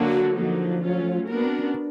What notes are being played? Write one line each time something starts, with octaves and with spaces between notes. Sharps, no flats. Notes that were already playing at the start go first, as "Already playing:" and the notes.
Already playing: D3 F#3 A#3 D4 F#4
D3 F3 F#3 A#3 D#4
F#3 A3 C#4 F4
A#3 B3 D4 F#4 A#4
C4
C#4
D4